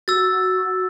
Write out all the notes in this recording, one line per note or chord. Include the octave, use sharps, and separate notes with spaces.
F#4 E6 A6